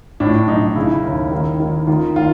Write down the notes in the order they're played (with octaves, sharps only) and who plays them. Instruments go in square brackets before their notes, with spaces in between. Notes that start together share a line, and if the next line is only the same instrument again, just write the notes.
[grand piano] A2 D4
B1 D#4
C#3 E4
D#2
D#3
D#3
D#3 F4
D#3 F4